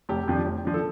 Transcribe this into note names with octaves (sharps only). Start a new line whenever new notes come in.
F1 G4
F2 F3 D4
F1
F3 D4
A4